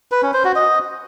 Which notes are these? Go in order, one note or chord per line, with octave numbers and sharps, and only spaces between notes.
B4
C#4
C5
F#4
D#5